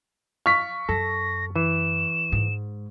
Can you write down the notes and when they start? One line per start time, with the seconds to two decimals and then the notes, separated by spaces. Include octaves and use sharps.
0.46 F5 C#6 B6
0.89 F#2 A4 A#6
1.56 E3 E7
2.32 G#2